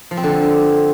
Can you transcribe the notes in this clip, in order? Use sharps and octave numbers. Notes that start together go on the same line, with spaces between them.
F3
C4
D3